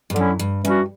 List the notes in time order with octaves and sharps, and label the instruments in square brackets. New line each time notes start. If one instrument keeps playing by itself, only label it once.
[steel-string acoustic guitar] G2
[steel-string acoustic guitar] F#2 [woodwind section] D3 F#3 C#4 E4
[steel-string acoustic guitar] G2
[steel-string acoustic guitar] G2 [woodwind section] E3 G3 C#4 F#4